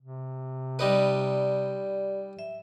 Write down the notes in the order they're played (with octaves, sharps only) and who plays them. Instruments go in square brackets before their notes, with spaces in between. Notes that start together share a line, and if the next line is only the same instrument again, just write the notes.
[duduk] C3
[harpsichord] G3 D#4 B4 [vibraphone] G4 D5
[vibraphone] E5